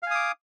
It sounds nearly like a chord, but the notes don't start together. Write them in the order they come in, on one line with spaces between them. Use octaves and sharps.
F5 G#5 D#6 D6